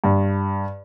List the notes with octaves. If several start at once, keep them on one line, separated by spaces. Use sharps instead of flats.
G2